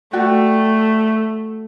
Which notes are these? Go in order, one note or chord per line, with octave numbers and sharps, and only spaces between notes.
A3 F#4 D5 G5